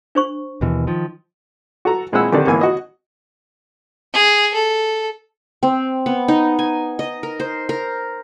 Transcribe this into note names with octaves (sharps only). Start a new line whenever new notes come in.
D4 C5 C#6
D#2 B2 E3
D#3 F3
F#4 A4 A#5
A#2 G#3 C4 E4 F#5 E6
D3 D#3 C4 G4 A4 D5
G#1 E3 A#3 B3 E4 G#5
F#4 D#5
G#4
A4
C4
B3
D#4
G#5
D#5
A#4
C5
A#4